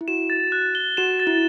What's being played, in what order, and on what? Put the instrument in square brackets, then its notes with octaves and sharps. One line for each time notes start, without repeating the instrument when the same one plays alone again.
[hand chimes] E4
[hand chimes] F#4 [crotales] E7
[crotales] A6
F#6
G7
[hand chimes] F#4 [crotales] E7
[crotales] A6
[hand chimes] E4